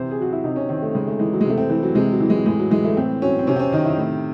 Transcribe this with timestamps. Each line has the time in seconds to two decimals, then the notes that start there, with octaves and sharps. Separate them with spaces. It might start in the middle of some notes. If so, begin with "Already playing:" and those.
Already playing: C3 E3 C5
0.11 G#4
0.19 F#3 F#4
0.32 E4
0.44 C3 D#4
0.56 C#4
0.69 D#3 C4
0.82 A3
0.95 C#3 G#3
1.07 A3
1.19 E3 G#3
1.33 F#3
1.41 G#3
1.45 C3 A3
1.58 C4
1.70 E3 A3
1.83 F#3
1.95 C3 G#3
2.12 F#3
2.20 E3
2.30 G#3
2.46 A2 G#3
2.59 F#3
2.71 E3 G#3
2.84 A3
2.97 A2 C4
3.22 F#3 C#4
3.39 C4
3.47 C3 C#4
3.56 C4
3.59 C#4
3.72 D#3 D#4
3.85 E4
3.98 A2